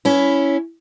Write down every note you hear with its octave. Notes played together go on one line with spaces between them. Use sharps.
C#4 E4